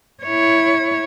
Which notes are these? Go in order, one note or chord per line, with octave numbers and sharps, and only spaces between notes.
E4 C#5